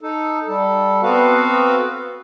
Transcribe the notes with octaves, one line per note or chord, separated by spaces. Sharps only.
D#4 A4
G3 A4
B3 C4 F#4 A4 B4 F5